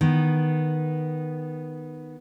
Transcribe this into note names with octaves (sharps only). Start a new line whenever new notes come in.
D#3 B3